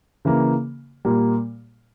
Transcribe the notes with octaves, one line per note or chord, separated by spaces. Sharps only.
C#3 E3 A#3
A#2 G3 A#3